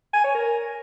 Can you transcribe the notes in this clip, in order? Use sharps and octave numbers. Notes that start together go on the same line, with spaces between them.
G#5
C#5
A#4